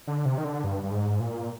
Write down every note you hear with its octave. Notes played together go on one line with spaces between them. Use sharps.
D3
C3
D#3
D3
G2
G2
G#2
A#2